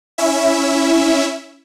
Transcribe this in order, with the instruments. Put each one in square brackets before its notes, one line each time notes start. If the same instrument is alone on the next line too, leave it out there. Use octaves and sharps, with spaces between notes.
[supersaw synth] C#4 E4 E5